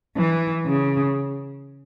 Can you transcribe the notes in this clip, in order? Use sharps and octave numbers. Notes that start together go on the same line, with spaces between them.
E3
C#3